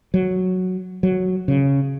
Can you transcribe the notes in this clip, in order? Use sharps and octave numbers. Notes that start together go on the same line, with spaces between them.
F#3
F#3
C#3